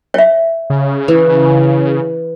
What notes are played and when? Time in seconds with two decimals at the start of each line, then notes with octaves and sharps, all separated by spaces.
0.14 C#5 E5
0.70 C#3
1.08 E3